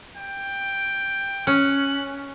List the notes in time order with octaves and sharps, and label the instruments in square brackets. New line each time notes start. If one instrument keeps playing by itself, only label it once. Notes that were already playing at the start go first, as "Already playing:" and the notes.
[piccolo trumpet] G5
[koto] C#4 [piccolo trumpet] F#6